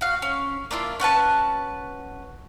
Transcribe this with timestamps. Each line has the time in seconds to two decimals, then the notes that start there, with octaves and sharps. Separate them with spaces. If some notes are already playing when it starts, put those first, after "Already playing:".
0.01 F#4 F5
0.22 C#4
0.71 A#3 D4 E4 F4
1.00 C#4 F#4 B4 A5